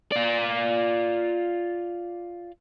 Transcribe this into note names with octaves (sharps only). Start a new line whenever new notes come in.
F4 D5